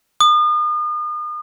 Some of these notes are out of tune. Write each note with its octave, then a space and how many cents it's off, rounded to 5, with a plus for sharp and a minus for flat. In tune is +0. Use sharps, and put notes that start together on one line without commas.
D#6 -40